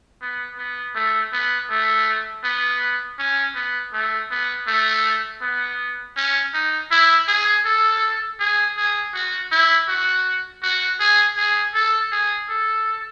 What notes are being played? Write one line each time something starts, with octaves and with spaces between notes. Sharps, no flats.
B3
B3
A3
B3
A3
B3
C#4
B3
A3
B3
A3
B3
C#4
D#4
E4
G#4
A4
G#4
G#4
F#4
E4
F#4
F#4
G#4
G#4
A4
G#4
A4